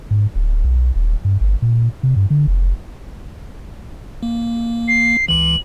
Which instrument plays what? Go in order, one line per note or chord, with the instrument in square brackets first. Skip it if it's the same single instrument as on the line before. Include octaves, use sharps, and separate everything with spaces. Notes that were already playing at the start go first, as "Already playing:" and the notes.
[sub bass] G#2
D1
B1
D#1
G2
G1
A#2
C3
G2
D3
F1
[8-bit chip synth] A#3
[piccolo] C7
[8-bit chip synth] C#2 E3 [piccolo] F#7